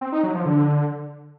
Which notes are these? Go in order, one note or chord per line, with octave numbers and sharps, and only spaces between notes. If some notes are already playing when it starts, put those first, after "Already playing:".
C4
D#4
F#3
F3
D3